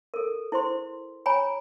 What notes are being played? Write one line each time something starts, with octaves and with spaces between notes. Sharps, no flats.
A4 A#4
E4 C5 C6
C#5 G#5 A#5 B5